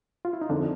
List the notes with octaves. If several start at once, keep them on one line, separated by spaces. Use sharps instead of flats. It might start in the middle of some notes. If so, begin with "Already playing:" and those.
F4
E4
D#4
F2 D3 D4